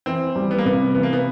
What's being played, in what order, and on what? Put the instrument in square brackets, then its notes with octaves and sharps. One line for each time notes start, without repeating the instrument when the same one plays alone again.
[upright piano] E3 [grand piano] C4
[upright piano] G3
[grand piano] B3
A#3
[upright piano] C3 [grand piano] B3
[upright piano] E3 [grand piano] B3
[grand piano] A#3
B3